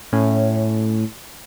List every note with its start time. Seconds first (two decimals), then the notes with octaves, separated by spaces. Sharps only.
0.12 A2 C#4